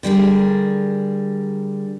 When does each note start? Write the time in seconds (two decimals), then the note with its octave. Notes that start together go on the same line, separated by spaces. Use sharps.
0.03 D3 G3 G#4 A#4